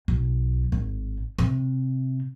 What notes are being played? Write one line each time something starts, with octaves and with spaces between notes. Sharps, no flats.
B1
G#1
C3